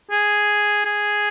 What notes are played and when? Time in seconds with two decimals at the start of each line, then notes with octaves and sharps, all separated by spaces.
0.11 G#4
0.85 G#4